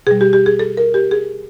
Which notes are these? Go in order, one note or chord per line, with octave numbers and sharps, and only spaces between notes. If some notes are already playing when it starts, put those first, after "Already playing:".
B2 G3 G#4
G4
G4
G#4
A4
A#4
G4
G#4